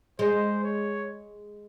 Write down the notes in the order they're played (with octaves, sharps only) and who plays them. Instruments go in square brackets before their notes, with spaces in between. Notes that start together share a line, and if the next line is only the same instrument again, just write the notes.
[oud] G#3 [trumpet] C5
[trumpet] C#5